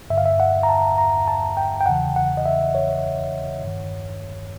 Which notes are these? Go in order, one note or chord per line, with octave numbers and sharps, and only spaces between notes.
G2 D3 E5
F5
E5
F#5
A#5
A5
A#5
A5
G5
G5
E2 C#3 E3 F#5
F#5
D#5
E5
C#5
G2 D#3